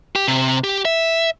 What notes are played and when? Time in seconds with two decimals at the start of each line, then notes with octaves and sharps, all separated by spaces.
0.15 G4
0.28 C3
0.64 G4
0.85 E5